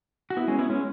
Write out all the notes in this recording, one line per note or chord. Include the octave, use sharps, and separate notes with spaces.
F#4
B3 E4
G#3 C#4
B3 E4
G#3 C#4